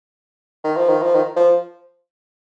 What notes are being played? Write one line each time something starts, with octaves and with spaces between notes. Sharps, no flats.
D#3
F3
D#3
F3
D#3
F3